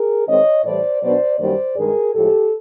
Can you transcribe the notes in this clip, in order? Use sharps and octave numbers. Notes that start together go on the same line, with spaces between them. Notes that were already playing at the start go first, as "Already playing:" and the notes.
Already playing: G#4 A#4
D#3 G#3 C4 D#4 C#5 D#5
A2 E3 G3 C5 D5
B2 F#3 B3 D4 C5 D5
F#2 D#3 G3 A#3 C5 D5
G2 D#3 G#3 G#4 A#4
A2 F3 G#3 G4 A4